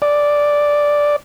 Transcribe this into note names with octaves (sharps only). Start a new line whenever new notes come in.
D5